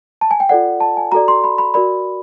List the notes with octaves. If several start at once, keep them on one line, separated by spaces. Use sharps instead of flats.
A5
G#5
G5
F4 A4 D5 F#5
A5
G#5
F#4 A4 D5 A#5
C6
B5
B5
F#4 A#4 D5 B5